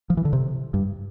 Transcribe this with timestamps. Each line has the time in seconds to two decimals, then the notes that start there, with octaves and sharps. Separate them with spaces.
0.10 F3
0.17 E3
0.25 D3
0.33 C3
0.74 G2